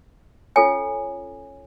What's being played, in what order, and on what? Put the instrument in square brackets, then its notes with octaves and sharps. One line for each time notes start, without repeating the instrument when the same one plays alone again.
[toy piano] C#4 F4 A4 C#5 G#5